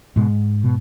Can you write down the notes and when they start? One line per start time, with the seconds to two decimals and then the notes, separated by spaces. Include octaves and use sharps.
0.16 G#2 B2 G#3
0.64 B2